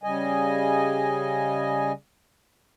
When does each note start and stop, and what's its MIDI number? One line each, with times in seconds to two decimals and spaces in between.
0.04 1.92 49
0.04 1.92 55
0.04 1.92 75
0.04 1.92 80